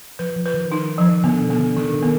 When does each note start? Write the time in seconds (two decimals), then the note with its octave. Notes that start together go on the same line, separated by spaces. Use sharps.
0.19 F3 B4
0.36 F3
0.46 B4
0.54 D#3
0.72 D#4
0.98 F3
1.24 D3 B3
1.41 B2
1.50 B3
1.59 D3
1.77 D#3 D4
1.94 D#3
2.03 B3